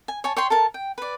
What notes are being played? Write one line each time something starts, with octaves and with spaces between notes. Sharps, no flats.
G#5
C#5 G#5 A5
C#5 G5 C6
A4 A#4 A5
G5
B4 D5